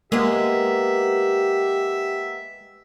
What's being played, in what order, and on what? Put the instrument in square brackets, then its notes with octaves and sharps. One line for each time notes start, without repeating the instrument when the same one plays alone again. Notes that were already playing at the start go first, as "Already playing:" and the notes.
[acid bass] G#3 [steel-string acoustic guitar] A#3 B3 [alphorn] G4 [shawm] E5